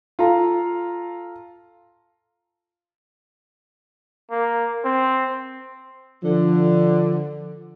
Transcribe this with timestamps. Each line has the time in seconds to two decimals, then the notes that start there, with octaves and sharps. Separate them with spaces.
0.19 F4 A4 A#5
4.31 A#3
4.85 C4
6.23 D3 F3